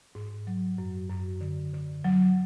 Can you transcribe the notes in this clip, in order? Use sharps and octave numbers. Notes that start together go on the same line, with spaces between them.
G#2
F#3
F#2
F#2
D3
D3
F#3